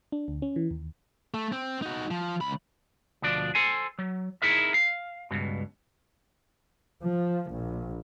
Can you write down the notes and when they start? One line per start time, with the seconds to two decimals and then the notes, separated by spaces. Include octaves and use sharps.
0.12 D4
0.28 D2
0.42 C#4
0.56 E3
0.71 D#2
1.34 A3
1.52 C4
1.82 D#4 F#4
2.11 F3
2.41 C#2 B5
3.22 D2 B2 F3 D4 D5
3.55 A4 C5 G#5
3.99 F#3
4.42 D#4 E4 G#4 A#4 E5
4.74 F5
5.31 C#2 G2 B2
7.03 F3
7.51 A#1